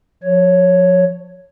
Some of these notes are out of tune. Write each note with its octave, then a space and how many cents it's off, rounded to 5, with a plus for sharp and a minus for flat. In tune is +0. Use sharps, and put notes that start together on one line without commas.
F3 +35 C#5 +0